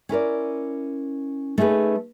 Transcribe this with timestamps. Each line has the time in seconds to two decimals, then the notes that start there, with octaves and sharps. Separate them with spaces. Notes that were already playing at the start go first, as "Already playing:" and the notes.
0.09 C#4 E4 A#4 D5
1.58 A3 C#4 D#4 G#4 B4